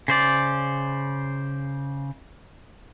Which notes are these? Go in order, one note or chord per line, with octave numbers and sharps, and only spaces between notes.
C#3 C5 D5